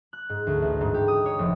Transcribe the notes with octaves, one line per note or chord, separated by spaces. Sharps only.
F#6
G#2
D2
A1
G#2
G4
D#6
C#5
F1